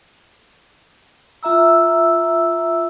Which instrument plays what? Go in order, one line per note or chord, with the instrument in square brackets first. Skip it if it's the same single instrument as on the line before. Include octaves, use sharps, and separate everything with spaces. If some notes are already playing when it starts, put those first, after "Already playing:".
[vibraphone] F4 E5 A#5 E6